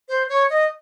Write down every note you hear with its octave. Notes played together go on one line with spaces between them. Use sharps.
C5
C#5
D#5